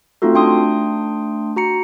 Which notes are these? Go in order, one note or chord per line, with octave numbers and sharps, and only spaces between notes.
A3 C4 D#4 F4 F#4 A4
A3 D4 G5 C6 D#6
F#4 A#5 C#7